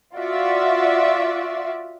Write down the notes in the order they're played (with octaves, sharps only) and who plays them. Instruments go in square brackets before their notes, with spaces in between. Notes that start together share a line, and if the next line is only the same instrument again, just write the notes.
[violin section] F4 F#4 D5 E5